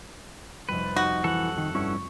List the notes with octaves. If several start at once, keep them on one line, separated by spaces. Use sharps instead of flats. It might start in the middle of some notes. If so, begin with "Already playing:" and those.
F1 F2 G3 B4
G6 A6
D#4 F#4
E3 A4 F#5
D#3
G2 C#4 E4 C#6